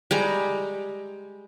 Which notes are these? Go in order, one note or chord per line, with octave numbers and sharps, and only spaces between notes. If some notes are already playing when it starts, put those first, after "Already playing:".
G3 G#3 A#5